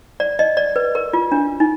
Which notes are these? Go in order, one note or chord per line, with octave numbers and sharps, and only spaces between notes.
D5
D#5
D5
B4
A#4
F4
D4
D#4